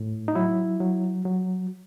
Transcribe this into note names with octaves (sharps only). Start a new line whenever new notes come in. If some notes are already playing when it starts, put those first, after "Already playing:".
Already playing: A2
D#4
F#3 E4
F#3
F#3